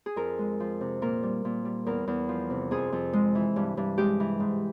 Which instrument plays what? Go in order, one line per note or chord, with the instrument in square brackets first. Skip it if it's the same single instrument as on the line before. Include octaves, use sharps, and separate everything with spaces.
[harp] G#4
F2 A#4
G#3
F3
C3
A#2 A#4
G3
A#2
G3
E2 A#4
E2
F3
C3
F2 G#4
F2
G#3
E3
G2
G2
G#3 G4
E3
G#2